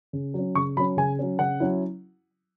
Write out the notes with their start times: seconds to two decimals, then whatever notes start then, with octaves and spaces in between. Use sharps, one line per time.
0.13 C#3
0.34 F#3 C#4
0.55 C#3 C#6
0.77 F#3 B5
0.80 C#4
0.97 C#3 G#5
1.19 F#3 C#4
1.39 C#3 F#5
1.60 F#3 C#4 E4